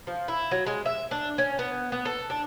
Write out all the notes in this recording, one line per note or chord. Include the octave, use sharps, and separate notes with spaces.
F3
E4
F#3
G#3
E5
D4
C#4
B3
B3
A4
D4